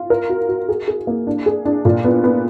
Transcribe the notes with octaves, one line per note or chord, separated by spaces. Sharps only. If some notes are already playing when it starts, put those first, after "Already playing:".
Already playing: F4
A#4
F#4
F#4
G#4
G#4
A#3
D4
G#4
D4
A#2
B3
B3